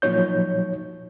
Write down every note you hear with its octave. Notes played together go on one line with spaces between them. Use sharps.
A#2 F3 F#3 D#4 C#5 G6